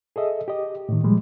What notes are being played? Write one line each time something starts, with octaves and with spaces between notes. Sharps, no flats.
G#4 A4 D#5 E5
G4 D#5
A2 D#3
A#2 F3 G3 G#3